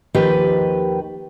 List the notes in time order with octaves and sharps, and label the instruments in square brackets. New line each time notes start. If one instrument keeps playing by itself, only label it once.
[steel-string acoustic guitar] D#2 D#3 F3 G4 B4 G5